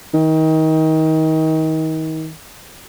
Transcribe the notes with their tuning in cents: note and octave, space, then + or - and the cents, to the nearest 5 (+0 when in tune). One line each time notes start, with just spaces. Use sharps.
D#3 +30